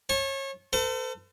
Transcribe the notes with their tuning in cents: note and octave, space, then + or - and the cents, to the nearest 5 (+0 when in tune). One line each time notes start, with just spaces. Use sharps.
C#5 -30 A5 -35
A4 +35 C5 -45 A5 +35